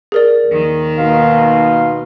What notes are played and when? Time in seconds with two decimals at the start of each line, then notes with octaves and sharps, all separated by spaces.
0.12 G#4 A#4 D5
0.48 D#2 D#3
0.98 B2 A#3 D#4 F5 C6